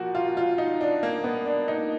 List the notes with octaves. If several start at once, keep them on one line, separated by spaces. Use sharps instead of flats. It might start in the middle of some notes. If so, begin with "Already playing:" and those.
Already playing: A#2 F3 F#4 A#4
F4
F4
D#4
D4
A#3
B3
D4
D#4